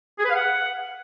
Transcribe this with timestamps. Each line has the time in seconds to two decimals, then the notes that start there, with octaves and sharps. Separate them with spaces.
0.19 G#4
0.24 B4
0.30 F5
0.35 F#5